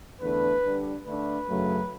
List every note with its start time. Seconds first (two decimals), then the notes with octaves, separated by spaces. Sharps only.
0.20 E2 D3 A3 D4 B4
0.62 D3 G3 D4
1.05 D3 A3 D4 B4
1.47 F#2 C#3 F#3 A3